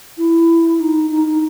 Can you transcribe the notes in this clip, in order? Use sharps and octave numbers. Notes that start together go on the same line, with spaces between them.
E4
D#4
D#4
D#4